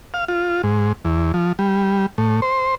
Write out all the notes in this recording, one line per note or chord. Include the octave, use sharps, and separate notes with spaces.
F5
F4
G#2
E2
F3
G3
A2
C5